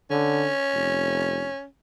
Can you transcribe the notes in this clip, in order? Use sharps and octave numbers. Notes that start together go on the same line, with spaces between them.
D3 C#4
F1